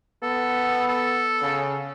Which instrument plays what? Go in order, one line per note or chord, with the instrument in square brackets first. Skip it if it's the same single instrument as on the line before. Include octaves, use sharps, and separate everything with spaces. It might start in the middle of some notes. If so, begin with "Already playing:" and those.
[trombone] B3 [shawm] A4
[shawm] A4
[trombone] C#3